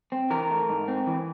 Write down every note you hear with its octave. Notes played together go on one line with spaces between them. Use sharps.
C4
E3 A#4
A3
G#2
C4
E3